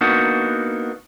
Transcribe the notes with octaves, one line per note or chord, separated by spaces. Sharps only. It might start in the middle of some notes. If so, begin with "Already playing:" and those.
A#3 B3 D4 D#4 F#4